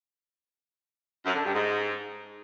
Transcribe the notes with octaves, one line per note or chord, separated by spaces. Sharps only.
F#2
D3
G2
G#2